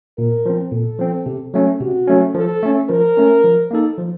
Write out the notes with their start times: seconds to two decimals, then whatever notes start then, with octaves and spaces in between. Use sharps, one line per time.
0.18 A#2 A#4
0.46 F3 C4
0.72 A#2 A4
0.99 F3 C4
1.26 C3
1.54 F#3 A3 C#4
1.80 C3 F#4
2.08 F#3 A3 C#4
2.35 F3 A4
2.63 A3 C#4
2.89 F3 A#4
3.17 A3 C#4
3.44 F3
3.71 A#3 D#4 A4
3.98 F3